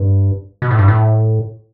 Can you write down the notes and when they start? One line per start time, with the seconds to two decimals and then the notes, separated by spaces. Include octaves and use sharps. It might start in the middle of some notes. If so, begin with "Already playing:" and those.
Already playing: G2
0.62 B2
0.71 A2
0.79 G2
0.88 A2